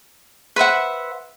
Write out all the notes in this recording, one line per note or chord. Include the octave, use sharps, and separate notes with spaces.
B4 C5 E5 F#5